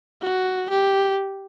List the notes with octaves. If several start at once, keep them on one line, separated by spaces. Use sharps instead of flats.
F#4
G4